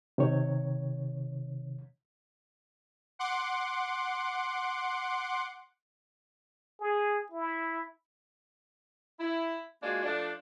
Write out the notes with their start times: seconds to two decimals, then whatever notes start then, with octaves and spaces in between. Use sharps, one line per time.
0.18 C3 D#3 C#5
3.19 F#5 C6 D6
6.80 G#4
7.32 E4
9.19 E4
9.81 G#3 A#3 D4 F4 F#4
10.03 F3 A3 D4